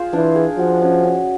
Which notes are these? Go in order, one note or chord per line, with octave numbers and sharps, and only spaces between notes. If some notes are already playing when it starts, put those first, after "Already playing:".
Already playing: F4 G#4 C5
E3 D4
G#4
F3 F#4
C#4
C#4